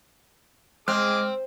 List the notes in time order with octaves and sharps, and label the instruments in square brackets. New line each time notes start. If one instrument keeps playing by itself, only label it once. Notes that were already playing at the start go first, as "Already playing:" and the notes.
[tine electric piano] G#3 [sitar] C4 [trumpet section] G#4 D#5 D6 [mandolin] F6